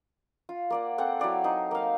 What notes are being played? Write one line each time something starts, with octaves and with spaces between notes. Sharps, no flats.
F4
A#3 D5 F#5
C4 A4 F#5
F#3 E4 D5 F5
D#4 C5
A#3 F5